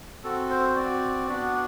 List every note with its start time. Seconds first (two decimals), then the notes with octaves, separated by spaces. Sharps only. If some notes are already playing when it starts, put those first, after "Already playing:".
0.24 C4 F#4 A4
0.50 C5
0.76 C4 F#4 D5
1.27 B3 D4 F#4 D5